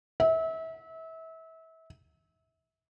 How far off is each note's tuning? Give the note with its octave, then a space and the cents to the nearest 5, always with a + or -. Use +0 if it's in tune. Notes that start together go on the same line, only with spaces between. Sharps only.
E5 -30